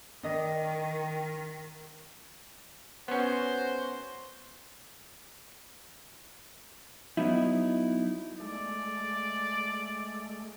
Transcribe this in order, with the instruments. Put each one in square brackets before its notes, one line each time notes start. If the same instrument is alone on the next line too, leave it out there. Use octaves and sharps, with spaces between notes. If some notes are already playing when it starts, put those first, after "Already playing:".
[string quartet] D#3 [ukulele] D4 D#5
[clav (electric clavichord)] B3 C#4 [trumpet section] F#4 C5
[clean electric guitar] F#3 B3 D#4 E4
[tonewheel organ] G#3 A3 [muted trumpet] D5